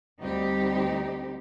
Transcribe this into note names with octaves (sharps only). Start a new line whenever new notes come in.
D2 G3 C4 D#4 G4